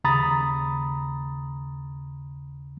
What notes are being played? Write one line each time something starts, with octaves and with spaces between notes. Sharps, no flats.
D#2 C#3 A#5 B5 D#6 A6